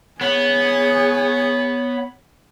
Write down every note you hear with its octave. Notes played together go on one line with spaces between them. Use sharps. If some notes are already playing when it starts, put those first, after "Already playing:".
B3 G#4 C#5